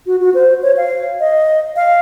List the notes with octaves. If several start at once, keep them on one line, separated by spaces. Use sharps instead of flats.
F#4
F#4
C5
C#5
F5
D#5
F5